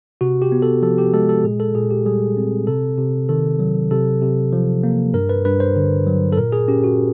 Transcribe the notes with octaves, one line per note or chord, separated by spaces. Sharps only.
C3 F#4
G4
B3
A4
F3 A4
G4
G#3 A4
A4
A#2 G#4
A4
A#2 G#4
G4
G3 G#4
C4
C3 A4
C3
D#3 A4
F#3
C3 A4
C3
F3
A#3
G2 A#4
B4
G2 B4
C5
D3
F#3
A4
A#2 A#4
G#4
C#4 G4
F#4